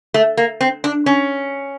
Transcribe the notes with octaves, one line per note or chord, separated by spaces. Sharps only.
A3
A#3
C4
D4
C#4